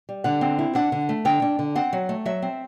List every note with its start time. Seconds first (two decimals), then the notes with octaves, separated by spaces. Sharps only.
0.09 G3
0.24 D3 F#5
0.41 C4
0.59 E4
0.75 D4 F#5
0.92 D3
1.09 A3
1.25 D3 G5
1.42 D4
1.59 D3
1.75 C4 F#5
1.93 F#3
2.09 A3
2.25 F#3 E5
2.42 C4